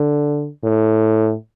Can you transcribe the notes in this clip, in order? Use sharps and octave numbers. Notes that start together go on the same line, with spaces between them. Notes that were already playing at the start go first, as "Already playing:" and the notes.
Already playing: D3
A2